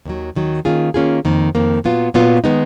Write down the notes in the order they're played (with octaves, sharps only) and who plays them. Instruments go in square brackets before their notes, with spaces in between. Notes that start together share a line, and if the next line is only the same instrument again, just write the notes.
[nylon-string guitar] D#2 D#3 F#3
D#2 D#3 F#3
D#3 A#3 C#4 F4 G#4
D#3 A#3 C#4 F4 G#4
F2 D#3 A#3
F2 D#3 A#3
A#2 F#3 B3 F4
A#2 F#3 B3 F4
D#3 G#3 B3 D#4